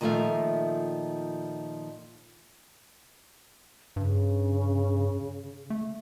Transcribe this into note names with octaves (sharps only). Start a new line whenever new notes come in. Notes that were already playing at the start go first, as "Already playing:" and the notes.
A#2 D#3 F3 A3 E5 F5
G2 C#3
A3